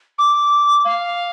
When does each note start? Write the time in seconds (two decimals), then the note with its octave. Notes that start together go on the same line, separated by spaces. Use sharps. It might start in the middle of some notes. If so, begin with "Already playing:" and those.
0.18 D6
0.84 F5